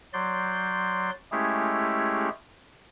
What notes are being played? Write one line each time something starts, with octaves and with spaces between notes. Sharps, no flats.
F#3 D5 C6 G6
G#3 A3 C#4 E4 G4 G#4